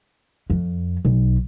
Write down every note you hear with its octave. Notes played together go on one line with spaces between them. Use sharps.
F2
B1